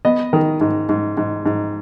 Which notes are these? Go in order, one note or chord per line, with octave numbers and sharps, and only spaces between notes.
B3 D#5
D#3
G#2
G#2
G#2
G#2